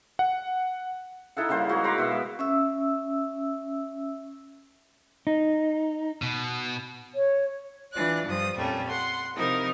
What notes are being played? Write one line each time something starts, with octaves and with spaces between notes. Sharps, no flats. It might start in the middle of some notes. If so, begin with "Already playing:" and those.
F#5
D#4 E4 A4 F#5
C#3 G3 A#3 C5
G#3 F#4 A#4
C5 A#5 B5 D6
B2 E5 F5
G#3
C#4 E5 E6
D#4
B2
C#5
E3 D4 F4 D5 F#6
G2 F3 D#6
F2 A#2 G3 A3 C#4
F#5 C6
C3 F3 D#4 E4 A#4